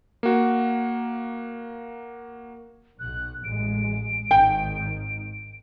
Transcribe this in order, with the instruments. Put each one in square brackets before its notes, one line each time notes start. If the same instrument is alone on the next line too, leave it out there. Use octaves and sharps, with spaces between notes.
[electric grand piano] A#3 F#4
[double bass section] B1 [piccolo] F#6
[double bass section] A1 G#3 [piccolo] D7
[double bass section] G#1 D#3 [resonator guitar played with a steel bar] G5